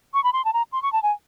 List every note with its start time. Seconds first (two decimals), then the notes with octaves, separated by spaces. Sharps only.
0.14 C#6
0.24 B5
0.33 C6
0.45 A5
0.54 A#5
0.73 C6
0.83 C#6
0.93 A5
1.03 G#5